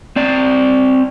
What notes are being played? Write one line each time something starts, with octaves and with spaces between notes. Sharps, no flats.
C4 D5